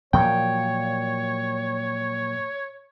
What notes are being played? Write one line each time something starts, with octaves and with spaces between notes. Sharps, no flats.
A#2 F3 F#3 C#5 G5